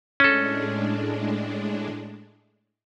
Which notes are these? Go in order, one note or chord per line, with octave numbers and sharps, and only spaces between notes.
A2 G#3 C#4 D4 A4